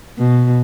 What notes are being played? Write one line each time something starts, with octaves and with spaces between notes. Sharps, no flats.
B2